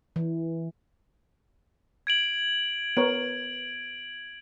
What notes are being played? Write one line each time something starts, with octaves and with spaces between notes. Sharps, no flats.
E3
G#6 D7 F#7
B3 A#4 C#5 D7